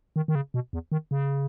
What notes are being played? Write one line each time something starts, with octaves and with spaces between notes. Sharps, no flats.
D#3
D#3
C#3
B2
E2
D#3
C#3